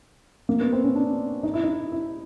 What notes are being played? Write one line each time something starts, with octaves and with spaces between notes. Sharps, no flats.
A#3
B3
C4
C#4
D4
D#4
E4
D#4
E4